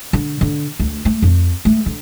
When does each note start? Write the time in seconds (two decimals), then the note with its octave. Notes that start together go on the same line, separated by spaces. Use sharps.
0.13 D3
0.41 D3
0.80 D2
1.05 A3
1.22 F2
1.65 A3
1.86 D3